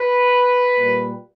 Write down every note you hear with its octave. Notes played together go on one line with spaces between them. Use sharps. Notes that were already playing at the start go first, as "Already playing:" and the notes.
Already playing: B4
A#2 G3 A#3